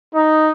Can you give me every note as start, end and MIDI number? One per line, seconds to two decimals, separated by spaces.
0.14 0.51 63